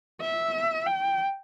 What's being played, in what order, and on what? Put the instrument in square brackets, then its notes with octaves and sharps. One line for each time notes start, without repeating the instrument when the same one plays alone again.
[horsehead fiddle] E5
G5